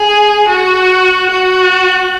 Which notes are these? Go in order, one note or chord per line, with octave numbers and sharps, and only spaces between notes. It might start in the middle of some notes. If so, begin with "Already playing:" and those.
Already playing: G#4
F#4
F#4